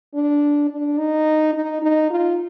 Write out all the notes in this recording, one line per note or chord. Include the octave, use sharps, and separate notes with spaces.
D4
D4
D#4
D#4
D#4
F4